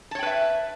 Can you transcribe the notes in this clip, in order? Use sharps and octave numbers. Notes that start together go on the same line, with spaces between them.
B4 C#5 E5 G5 A5